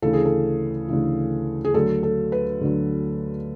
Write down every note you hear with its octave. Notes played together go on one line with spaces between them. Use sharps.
D2 C#3 E3 A4
G#4
A4
D2 C#3 E3
G#4
D2 D3 F#3 A4
A4
B4
D2 D3 F#3